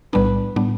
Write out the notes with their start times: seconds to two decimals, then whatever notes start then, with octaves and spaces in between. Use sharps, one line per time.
0.13 B1 A2 G3 B3 D4 B4
0.56 A2 G3 B3 D4